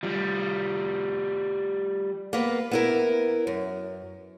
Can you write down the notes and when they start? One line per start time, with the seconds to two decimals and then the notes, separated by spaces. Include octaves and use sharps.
0.03 F3 G3
2.33 A#3 B3 B4
2.71 B3 E4 A#4
3.47 F#2